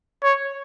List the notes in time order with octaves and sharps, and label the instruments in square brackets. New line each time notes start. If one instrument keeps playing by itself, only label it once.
[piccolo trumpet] C#5